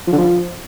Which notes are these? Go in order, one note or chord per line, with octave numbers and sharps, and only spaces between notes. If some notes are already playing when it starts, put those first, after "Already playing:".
F3
D3
F3